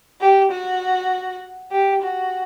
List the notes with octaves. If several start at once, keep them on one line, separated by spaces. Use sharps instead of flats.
G4
F#4
G4
F#4